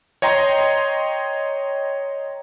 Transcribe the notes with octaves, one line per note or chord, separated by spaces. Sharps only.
C#5 D#5 G5 A#5 C6